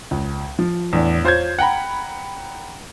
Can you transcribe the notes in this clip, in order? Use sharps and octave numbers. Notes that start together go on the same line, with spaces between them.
C#2
F3
E2 A2 D4
F4 C5 C#5 G6 G#6
F#5 G5 A#5 B5